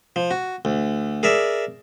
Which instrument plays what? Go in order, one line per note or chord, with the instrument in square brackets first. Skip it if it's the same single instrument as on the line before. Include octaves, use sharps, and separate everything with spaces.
[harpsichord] F3
F#4
D2
G#4 A#4 D5 E5